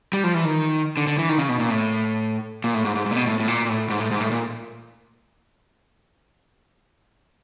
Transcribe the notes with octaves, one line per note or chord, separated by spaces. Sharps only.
G3
F3
E3
D#3
D3
D3
E3
D#3
C#3
B2
A#2
A2
A#2
A2
G#2
G#2
G#2
A#2
B2
A2
A2
A#2
A#2
A2
G#2
A2
G#2
A2
A#2